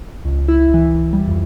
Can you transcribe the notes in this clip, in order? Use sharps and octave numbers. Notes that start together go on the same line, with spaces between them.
C#2
E4
E3
G3
F2